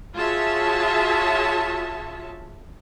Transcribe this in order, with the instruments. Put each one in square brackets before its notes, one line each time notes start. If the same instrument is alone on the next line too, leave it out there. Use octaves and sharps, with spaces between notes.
[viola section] F4 F#4 G#4 C#5 E5 A5